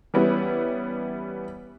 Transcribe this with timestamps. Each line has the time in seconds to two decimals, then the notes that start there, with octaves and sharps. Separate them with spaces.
0.14 E3 G3 B3 C#4 E4